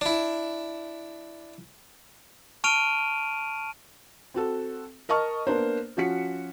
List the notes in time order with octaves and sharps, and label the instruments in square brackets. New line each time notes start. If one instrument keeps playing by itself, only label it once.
[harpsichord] D4 E4
[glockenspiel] A5 C#6 F6 D7 D#7 F7
[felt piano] C4 F#4 A4
A#4 D#5 A5 C#6 F6
A#3 B3 D4 A#4 C5
F3 C#4 F#4 F#5 B6 C#7